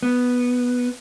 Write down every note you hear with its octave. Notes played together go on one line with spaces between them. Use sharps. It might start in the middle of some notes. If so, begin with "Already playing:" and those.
B3